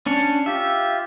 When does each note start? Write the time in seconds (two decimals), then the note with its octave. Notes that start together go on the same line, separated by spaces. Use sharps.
0.06 C#4 D4 C#5
0.46 F4 G4 E5